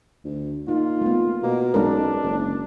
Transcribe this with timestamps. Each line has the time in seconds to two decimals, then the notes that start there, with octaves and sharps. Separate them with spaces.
0.24 D2
0.68 A#2 D#4 F4
1.01 A3 B3
1.43 B2 A#3
1.74 B1 G#3 C#4 D4 A#4
2.23 F#1